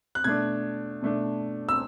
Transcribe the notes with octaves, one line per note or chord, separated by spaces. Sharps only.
F#6
B2 A3 D4 G#6
B2 A3 D4
E6